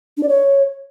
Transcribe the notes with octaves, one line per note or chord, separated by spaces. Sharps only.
D4
D5
C#5